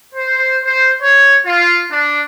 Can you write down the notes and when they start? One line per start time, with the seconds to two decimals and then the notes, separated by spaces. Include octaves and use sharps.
0.14 C5
0.64 C5
1.02 C#5
1.46 F4
1.91 D4